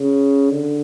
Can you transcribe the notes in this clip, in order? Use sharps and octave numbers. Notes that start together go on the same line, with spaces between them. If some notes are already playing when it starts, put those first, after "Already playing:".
Already playing: C#3
D3